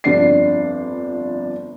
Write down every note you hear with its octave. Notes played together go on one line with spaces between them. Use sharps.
G1 F2 D4 C7